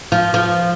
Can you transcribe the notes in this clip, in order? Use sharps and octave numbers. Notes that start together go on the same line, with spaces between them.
F3
F3